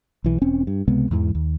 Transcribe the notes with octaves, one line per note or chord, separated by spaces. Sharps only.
B1 E3
E1 C4 C#4
G2
C#2 C3 G#3 B3
E2 G#2 E3
D#2